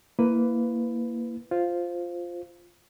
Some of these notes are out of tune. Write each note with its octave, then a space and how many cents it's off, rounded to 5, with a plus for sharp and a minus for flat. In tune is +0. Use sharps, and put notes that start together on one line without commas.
A#3 +0 E4 +5 B4 +15
F4 +0 C5 +0